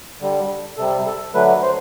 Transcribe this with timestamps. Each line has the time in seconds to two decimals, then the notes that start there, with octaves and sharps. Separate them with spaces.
0.21 D3 G3
0.77 C3 G3 A4
1.06 A4
1.34 D3 F#3 A3 B4
1.62 C5